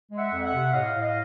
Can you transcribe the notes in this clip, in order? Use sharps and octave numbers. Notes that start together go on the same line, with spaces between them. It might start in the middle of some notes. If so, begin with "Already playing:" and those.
G#3
E5 F#5
F2
E5 F#5
C3
A2 D#5 F5
A2
D#5 F5